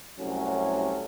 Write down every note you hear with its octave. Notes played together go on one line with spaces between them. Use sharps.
C2 F#3 A3 C#4